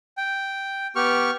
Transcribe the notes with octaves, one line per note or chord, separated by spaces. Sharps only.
G5
B3 G4 C#6 F6